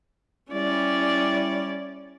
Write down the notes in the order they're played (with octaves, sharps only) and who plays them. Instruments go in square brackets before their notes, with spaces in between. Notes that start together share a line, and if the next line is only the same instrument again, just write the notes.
[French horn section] G3 E4 [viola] C#4 D5